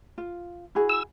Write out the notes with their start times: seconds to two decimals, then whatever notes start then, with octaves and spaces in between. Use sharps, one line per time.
0.18 F4
0.75 E4 F#4 G#4
0.89 E6